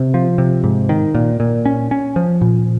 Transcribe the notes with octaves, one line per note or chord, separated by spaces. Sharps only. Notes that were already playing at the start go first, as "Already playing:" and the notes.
Already playing: C3
F3
C3
G#2
D#3
A#2
A#2
C#4
C#4
F3
A#2